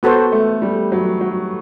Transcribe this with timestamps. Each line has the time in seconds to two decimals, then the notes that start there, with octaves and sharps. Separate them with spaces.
0.03 B3 F#4 A4 C5
0.32 A3
0.62 G3
0.92 F#3
1.21 F#3